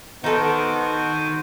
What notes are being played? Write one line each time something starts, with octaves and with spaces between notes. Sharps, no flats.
D#3 B3 D#4 F#4 A4 C5